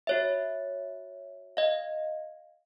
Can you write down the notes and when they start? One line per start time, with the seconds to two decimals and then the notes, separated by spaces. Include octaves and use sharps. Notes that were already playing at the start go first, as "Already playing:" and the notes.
0.07 F#4 C#5 E5
1.57 D#5 F5